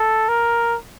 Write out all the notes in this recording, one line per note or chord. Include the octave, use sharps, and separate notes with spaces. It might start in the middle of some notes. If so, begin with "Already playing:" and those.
Already playing: A4
A#4